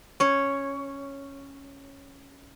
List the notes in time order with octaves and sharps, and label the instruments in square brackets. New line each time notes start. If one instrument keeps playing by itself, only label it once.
[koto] C#4 C#5